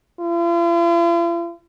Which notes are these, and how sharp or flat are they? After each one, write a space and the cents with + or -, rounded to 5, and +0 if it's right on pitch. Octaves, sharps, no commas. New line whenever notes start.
F4 -45